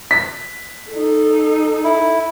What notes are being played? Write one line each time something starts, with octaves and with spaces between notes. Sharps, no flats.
B6
D#4 A4
E4